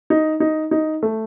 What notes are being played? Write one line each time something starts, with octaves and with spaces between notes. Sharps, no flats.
D#4
D#4
D#4
A3